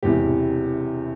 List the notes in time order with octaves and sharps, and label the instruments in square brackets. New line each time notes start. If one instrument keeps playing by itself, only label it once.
[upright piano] E1 E2 C3 E3 G4